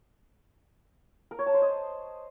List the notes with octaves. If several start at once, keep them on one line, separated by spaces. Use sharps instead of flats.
A#4
C#5
A5
C5
D#5